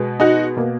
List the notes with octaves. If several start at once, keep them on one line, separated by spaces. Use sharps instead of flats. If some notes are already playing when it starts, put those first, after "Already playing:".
Already playing: B2 G#3 B3
D#4 F#4
B2 A#3